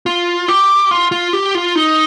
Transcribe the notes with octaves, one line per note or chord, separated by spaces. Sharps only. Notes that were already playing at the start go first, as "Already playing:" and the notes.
F4
G4
F4
F4
G4
F4
D#4